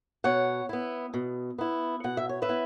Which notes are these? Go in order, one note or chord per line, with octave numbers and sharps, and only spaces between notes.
B2 C#5 F#5
B3 E4
B2
B3 E4
B2 F#5
E5
C#5
B4 E5
B3 E4